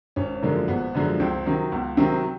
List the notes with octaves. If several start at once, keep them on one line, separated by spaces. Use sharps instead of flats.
G#1 C#4
F#2 D3 F3 G#3 A#3
G#1 B3
F#2 D3 F3 G#3
C#2 C4
C3 D#3 F#3
C#2 B3
C3 D#3 F#3 C4